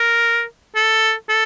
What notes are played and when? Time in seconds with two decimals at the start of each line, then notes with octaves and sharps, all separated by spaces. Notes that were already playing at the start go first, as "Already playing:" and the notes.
Already playing: A#4
0.76 A4
1.29 A4